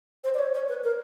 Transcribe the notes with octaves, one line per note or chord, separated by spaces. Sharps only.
C5
D5
C#5
C#5
B4
A#4